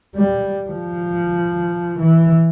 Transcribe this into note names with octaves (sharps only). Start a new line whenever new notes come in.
G3
F3
E3